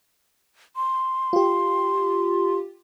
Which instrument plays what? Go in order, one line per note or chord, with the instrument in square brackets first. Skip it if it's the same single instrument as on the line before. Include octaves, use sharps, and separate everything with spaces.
[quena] C6
[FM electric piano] F4 G4